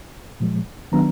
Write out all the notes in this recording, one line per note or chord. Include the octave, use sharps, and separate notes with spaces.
A#2 F3 G#3
D#3 F#3 B3 D4 A#5